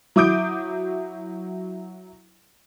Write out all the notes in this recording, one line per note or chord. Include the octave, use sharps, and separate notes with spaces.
F#3 E4 D6 D#6 G6 D7